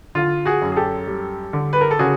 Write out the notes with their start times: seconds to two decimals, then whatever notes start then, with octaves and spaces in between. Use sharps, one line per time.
0.15 D3 F4
0.45 F#4 G#4
0.62 F#2
0.72 G#4
0.76 G4 A4
1.07 G3
1.53 D3
1.73 B4
1.81 A#4
1.91 A4
1.99 C#3 F#4 G#4